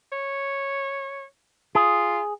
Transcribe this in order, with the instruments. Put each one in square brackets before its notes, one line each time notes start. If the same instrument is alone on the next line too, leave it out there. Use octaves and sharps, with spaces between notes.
[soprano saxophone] C#5
[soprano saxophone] F4 [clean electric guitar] G#4